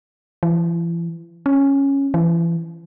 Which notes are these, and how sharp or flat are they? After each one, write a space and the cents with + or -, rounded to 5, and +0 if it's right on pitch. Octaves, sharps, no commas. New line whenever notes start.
E3 +40
C#4 -5
E3 +30